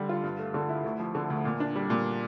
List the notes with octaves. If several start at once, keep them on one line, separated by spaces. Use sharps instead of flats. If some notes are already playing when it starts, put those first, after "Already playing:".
Already playing: D3 G3
F4
G2
A3
D3
E4
D2
F3
D3
D2
A#2
D4
G3
A#2